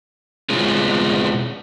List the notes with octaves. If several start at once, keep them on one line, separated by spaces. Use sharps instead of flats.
B2 G#3 C4 F4 G#4